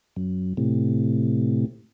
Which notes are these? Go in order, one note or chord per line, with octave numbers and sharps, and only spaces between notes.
F#2
A2 C3